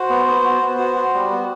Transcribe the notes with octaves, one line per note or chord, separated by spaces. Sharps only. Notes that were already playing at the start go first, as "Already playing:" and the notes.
Already playing: F#4 C5
B3
B3
F#4
B3
F#4
F#4
G3
B3